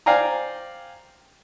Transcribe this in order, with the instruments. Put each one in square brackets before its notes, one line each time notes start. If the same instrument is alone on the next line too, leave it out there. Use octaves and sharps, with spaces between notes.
[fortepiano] C5 D5 F5 G5 G#5 A#5